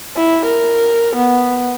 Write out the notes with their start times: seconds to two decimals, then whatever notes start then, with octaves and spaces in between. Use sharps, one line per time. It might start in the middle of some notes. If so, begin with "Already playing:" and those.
0.16 E4
0.45 A#4
1.15 B3